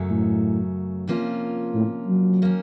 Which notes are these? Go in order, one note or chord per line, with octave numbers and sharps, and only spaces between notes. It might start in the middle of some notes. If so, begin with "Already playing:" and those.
Already playing: F#2 C#3 F#3 A3
A2
C3 F3 A#3 C#4 F4
A2
F#3
D#3 A#3 C#4